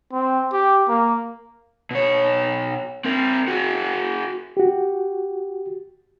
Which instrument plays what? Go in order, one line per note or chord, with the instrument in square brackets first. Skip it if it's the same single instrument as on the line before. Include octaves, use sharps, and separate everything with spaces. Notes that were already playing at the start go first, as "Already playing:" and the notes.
[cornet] C4
G4
A#3
[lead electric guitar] B2 C#5
C4 A#4
F#4 G#4
[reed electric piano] F#4 G4